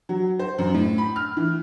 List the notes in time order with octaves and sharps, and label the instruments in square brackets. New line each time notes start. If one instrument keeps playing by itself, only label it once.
[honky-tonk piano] F#3
C5
F#2
A2
B5
F6
E3